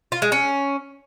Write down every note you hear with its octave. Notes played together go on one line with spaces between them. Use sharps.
F4
G#3
C#4